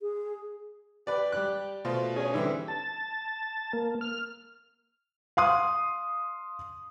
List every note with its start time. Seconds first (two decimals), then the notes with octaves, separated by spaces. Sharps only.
0.01 G#4
1.07 G4 B4 D5
1.32 G3 D5 F#6
1.85 B2 A3 F4 C5
2.16 C#4 G#4 C#5
2.34 D3 E3 G3 C4 E4
2.68 A5
3.73 A#3
4.01 F6
5.37 F5 C6 D#6